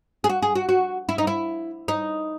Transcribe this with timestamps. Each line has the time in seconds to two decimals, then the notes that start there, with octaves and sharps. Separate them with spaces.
0.24 G#4
0.30 F#4
0.42 G#4
0.55 F#4
0.69 F#4
1.09 E4
1.18 D#4
1.27 E4
1.88 D#4